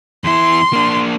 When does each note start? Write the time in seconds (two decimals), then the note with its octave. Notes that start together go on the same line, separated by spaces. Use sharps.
0.24 E2 E4 C6
0.73 A#3 D4